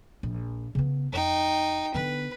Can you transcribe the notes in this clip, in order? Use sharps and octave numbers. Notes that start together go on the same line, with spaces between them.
A#1
C#3 B3
F2 D#4 G5
D3 B3 B4